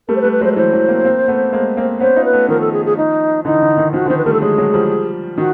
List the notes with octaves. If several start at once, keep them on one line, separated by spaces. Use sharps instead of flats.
G3 A3 A#4
C5
B4
G3 A3
B4
F#3 G#3 C5
B4
E3 F#3 C5
E3 F#3
A#3 C4
A#3 C4
A3 B3
G#3 A#3
A#3 C4
B3 C#4 C5
D#4 F4
B4
A3 B3
D#3 F3 A#4
A4
G#4
G#4
D#4
D3 E3 D#4
D3
D#3
D#3 F3 F#4
D3
D#3 C5
B4
G3 A3 A#4
A4
F#3 G#3 G#4
F#3 G#3
F3 G3
D#3 F#4